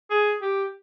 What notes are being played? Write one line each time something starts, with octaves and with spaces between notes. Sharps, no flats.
G#4
G4